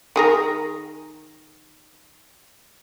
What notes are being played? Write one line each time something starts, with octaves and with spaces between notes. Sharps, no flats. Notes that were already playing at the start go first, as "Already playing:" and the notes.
D#3 G#4 A#4